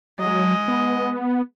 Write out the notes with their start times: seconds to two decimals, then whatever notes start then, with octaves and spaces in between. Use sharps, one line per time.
0.19 F#3 G#3 D#5
0.68 B3